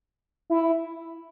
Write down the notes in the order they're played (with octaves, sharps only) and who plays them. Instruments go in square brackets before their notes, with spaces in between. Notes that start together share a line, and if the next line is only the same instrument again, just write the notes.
[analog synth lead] E4